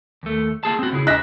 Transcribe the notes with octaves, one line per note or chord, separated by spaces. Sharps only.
D#2 A3
A#3 G#4 A5
C4 F#4
C#3 E4 G#4
D4 E5 F#6 A#6